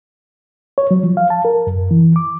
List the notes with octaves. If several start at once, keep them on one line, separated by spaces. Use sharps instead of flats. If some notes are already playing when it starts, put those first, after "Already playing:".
C#5
F#3
F3
F5
A5
A#4
F#2
E3
D6